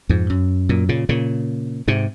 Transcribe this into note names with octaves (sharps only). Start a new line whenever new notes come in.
F2 G#2
F#2
F#2 A#2
A#2 C#3
A#2 C#3
G#2 C3